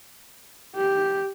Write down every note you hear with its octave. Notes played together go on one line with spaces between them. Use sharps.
G4